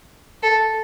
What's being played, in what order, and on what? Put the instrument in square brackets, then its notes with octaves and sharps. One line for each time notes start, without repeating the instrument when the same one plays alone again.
[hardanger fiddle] A4